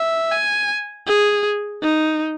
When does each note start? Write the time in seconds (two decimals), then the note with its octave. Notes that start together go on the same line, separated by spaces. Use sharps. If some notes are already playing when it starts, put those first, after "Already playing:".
Already playing: E5
0.32 G#5
1.07 G#4
1.83 D#4